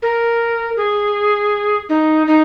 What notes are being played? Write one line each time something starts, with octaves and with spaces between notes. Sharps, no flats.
A#4
G#4
D#4
D#4